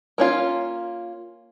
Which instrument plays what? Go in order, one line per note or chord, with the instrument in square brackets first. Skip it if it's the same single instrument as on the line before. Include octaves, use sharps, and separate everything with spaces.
[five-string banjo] A#3 C#4 F4